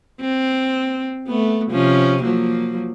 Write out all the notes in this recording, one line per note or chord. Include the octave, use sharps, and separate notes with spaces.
C4
A3 B3
C3 F3 C#4
F3 F#3 A#3